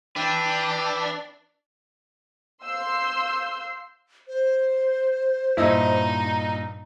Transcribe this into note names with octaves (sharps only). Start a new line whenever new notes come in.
D4 B4 E5 G5
F5 C6 E6 G6 C7
C5
G2 A#2 D#4 E4 D#5